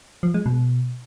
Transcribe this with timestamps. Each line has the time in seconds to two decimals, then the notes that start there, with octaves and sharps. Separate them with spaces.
0.23 F3
0.34 G#3
0.46 B2